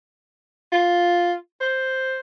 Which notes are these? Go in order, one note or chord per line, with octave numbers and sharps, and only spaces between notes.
F4
C5